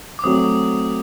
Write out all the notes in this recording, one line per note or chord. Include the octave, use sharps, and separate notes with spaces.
D6
F#3 A3 C4 D#6